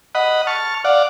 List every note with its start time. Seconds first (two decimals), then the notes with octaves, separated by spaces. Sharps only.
0.15 D#5 F#5 B5
0.47 A5 C#6 F6
0.84 D5 F5 F#5